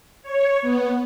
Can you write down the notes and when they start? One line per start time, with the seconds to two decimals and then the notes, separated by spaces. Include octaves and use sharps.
0.23 C#5
0.62 B3